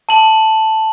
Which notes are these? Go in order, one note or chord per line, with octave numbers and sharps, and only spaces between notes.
A5 F#7